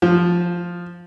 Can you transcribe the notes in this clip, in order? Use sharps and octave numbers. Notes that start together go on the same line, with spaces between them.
F3